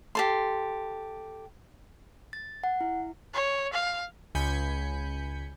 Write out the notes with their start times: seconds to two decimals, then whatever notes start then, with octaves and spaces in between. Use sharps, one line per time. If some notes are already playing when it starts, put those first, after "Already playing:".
0.15 G4 A4 C6
2.33 A6
2.64 F#5
2.81 E4
3.34 C#5
3.73 F5
4.35 C#2 G#5 B5 G6 B6 C#7